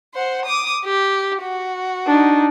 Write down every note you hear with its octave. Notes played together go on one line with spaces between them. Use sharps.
C5 F#5
D6 D#6
G4
F#4
D4 D#4